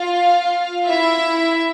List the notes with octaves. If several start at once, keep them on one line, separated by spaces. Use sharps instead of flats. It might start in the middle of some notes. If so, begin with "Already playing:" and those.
Already playing: F4 F5
E4 E5